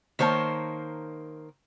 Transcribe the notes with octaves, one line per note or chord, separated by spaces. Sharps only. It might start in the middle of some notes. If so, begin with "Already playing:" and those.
D#3 A#3 C5 C#5 A5